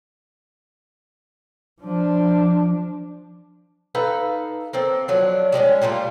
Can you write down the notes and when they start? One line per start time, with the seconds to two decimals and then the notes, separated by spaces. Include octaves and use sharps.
1.81 F3 D4
3.95 D#4 A4 B4 F5
4.73 A#3 C4 A4
5.08 F3 F#3 D4
5.52 G3 G#3 C4 C#4
5.82 A#2 G3 A3 F4